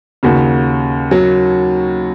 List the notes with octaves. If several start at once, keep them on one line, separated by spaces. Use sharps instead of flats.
D#2 C#3 F#4
F#3